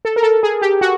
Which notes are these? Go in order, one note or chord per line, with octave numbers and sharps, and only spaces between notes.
A4
A#4
A4
G#4
G4
F#4